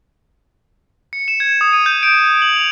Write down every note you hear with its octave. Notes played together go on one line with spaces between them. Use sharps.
C#7
E7
G#6
D#6
D#7
G6
D7
F#7
F7